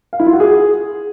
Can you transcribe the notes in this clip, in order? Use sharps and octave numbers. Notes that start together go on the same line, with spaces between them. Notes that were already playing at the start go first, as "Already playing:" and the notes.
F5
E4
F4
F#4
G#4